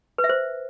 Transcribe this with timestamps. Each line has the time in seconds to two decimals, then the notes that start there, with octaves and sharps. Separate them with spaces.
0.18 B4
0.24 E5
0.29 C5